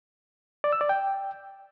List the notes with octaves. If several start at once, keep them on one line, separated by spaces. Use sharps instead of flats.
D5
E6
D5
G5